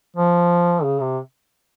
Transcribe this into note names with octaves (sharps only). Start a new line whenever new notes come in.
F3
C#3
C3